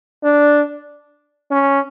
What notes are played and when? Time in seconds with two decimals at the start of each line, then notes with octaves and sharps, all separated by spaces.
0.24 D4
1.51 C#4